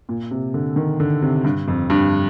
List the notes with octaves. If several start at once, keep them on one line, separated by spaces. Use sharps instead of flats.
A#2
C3
D3
D#3
D3
C3
G2
F2
G2